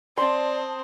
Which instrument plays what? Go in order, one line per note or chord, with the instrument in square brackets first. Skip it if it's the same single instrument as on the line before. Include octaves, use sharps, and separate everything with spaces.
[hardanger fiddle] C4 [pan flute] D5 [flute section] A5 D#6 [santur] C6